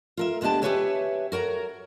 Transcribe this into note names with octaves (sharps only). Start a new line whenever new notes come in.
F4 A#4 E5
D2 G#3 B3 D4 G4 A5
G4 A4 B4 C#5 E5 G#5
F#4 A#4 C#5 A#5